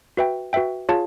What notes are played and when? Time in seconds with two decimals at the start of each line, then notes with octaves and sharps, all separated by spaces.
0.17 F#4 B4 E5 G5
0.53 F#4 B4 E5 G5
0.89 F4 G#4 C#5 F5 A5